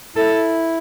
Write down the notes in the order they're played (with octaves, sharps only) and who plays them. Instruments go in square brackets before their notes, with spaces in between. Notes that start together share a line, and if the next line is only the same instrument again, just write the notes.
[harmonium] E4 [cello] A4